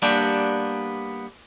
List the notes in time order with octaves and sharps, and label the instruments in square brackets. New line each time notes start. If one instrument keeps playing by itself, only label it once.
[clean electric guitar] G3 A#3 B3 D4 G4